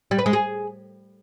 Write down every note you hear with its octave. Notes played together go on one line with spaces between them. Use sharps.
G3
B4
G#3
G#4